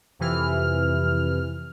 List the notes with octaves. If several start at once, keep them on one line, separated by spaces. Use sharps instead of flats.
F2 C3 E3 F6